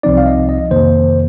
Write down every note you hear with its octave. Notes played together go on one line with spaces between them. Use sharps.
C2 C3 F3 C4 D#4 D5
F5
D#5
D#5
F2 C3 D#3 A#3 C5